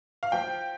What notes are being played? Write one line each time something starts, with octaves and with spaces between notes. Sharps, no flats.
F5
F3 G5